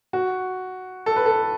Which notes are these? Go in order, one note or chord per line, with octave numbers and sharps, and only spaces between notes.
F#4
A4
B4
A4